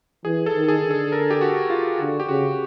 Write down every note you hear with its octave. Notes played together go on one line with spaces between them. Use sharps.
E3 G#4
A4
D#3
G#4
D3
A4
A#4
G4
F#4
F4
D3 F#4
G4
C#3 F#4